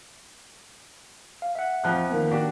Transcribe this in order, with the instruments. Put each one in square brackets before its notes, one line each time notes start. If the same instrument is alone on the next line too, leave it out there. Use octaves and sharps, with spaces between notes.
[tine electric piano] F5
E5 F#5
[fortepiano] F2 F3 F#6
[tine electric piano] D#3 A#3 B3
[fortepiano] D4 F#4 G4